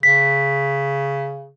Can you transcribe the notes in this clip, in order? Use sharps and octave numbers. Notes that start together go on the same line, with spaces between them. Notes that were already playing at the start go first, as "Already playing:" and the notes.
C#3 B6